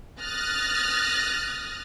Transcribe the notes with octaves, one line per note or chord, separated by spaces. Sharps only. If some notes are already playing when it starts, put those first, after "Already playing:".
D#6 F6 F#6 A6 A#6